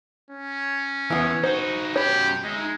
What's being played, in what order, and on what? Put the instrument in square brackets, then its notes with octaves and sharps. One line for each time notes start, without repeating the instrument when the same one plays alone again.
[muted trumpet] C#4
[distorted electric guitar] E2 [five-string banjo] E3 B3
[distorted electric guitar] D#4 F#4 [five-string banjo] C5
[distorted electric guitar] F#2 B5 [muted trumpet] G4 [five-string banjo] C#5
[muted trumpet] G#3 [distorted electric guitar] D#4 E4